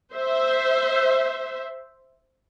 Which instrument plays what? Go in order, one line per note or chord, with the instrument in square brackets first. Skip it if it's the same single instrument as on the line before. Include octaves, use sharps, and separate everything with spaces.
[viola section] C5 E5